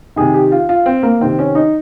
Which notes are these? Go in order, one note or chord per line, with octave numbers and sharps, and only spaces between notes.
C3 D#3 G#4
G4
F4
F4
C4
A#3
C3 D#3 C4
C#4
D#4